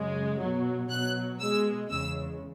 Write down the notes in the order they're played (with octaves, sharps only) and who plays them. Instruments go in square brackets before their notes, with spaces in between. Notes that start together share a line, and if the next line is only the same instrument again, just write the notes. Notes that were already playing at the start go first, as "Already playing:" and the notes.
Already playing: [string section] F#2 C#3 G#3
B2 F#3
B2 F#3 F#6
B2 G#3 E6
E2 C#3 G#3 E6